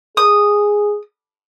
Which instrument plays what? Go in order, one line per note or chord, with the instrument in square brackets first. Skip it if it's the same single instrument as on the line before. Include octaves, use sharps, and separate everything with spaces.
[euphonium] G#4 [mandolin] D#6